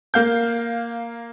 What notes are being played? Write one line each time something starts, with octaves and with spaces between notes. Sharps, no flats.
A#3 F5 G6